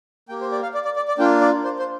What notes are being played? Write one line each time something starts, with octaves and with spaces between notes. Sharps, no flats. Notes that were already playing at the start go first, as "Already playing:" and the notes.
A#3 G4 G5
C5
D5
F5
D5
D5
D5
D5
A#3 D4 F4 G5
D5
C5
C5